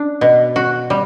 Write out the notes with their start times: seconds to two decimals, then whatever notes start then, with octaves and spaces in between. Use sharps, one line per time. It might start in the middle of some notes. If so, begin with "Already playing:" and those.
Already playing: D4
0.21 B2
0.56 F#4
0.90 G3